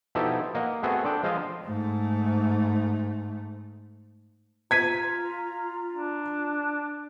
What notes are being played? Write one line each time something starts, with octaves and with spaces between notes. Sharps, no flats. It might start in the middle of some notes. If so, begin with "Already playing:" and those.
B2 F3 D#4 E4 G4 A4
A#3 D#5 F#5
A3 B3 C4 F#4 G#4
D4 A4 D5 G5
F3 G#3 F4 C5 D#5 F5
G#2 A3
F4 A#5 G#6 B6 D#7
D4